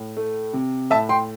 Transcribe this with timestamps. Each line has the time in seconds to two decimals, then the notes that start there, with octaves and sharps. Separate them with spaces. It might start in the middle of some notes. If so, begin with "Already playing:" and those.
Already playing: A2
0.17 A3
0.53 C3
0.90 A2 E5 A5
1.09 G5 C6